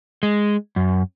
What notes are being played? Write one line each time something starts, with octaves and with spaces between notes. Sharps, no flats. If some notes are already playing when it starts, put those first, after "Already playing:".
G#3
F#2